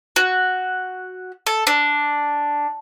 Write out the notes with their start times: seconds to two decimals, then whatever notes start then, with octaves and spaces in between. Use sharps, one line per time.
0.16 F#4
1.47 A4
1.67 D4